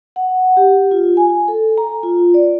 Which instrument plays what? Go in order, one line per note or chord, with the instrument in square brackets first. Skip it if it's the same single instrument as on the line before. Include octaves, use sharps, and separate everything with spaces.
[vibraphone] F#5
G4
F4
G#5
A4
A#5
F4
D5